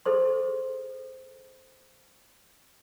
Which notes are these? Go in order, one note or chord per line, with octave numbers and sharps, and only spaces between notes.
G#4 A4 C5 C6